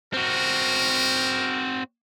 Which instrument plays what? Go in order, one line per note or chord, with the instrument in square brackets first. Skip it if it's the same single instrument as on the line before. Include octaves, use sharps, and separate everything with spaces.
[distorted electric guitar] C4 F#4 [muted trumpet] A#4